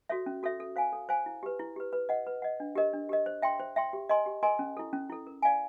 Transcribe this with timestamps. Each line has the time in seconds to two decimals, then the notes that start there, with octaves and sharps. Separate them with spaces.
0.09 F#4 A4 C#5 E5
0.26 C#4
0.43 F#4 A4 C#5 E5
0.60 A4
0.76 C5 F5 G#5
0.93 A4
1.09 C5 F5 G#5
1.26 E4
1.43 G4 B4
1.59 E4
1.76 G4 B4
1.93 B4
2.09 D#5 F#5
2.27 B4
2.42 D#5 F#5
2.60 D4
2.75 G4 A#4 D#5
2.93 D4
3.09 G4 A#4 D#5
3.26 C5
3.42 E5 G5 C6
3.60 C5
3.76 E5 G5 C6
3.93 G4
4.09 A#4 D#5 G#5 C6
4.26 G4
4.43 A#4 D#5 G#5 C6
4.59 C#4
4.77 E4 A4
4.93 C#4
5.10 E4 A4
5.27 A#4
5.42 D5 F5 G#5